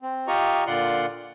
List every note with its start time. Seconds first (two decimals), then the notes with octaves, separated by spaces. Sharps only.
0.02 C4
0.28 F4 G4 D#5 A#5 C#6
0.67 A#2 D3 F4 D5 F#5 C6